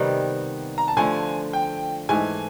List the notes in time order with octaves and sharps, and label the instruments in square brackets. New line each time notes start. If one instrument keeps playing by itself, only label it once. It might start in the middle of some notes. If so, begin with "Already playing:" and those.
Already playing: [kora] C3 D#3 G3 B3
[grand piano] A#5
A5
[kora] D3 F3 A3 [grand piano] G#5
[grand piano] G5
[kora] G#2 E3 A3 [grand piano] G#5